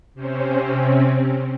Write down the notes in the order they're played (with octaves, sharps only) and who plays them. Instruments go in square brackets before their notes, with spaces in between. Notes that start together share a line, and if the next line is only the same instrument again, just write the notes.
[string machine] C3 C4 C#4